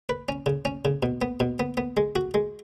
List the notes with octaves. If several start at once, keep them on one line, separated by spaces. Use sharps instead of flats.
B4
C#4
C#3
C#4
C#3
B2
B3
B2
B3
B3
G#3
F#4
G#3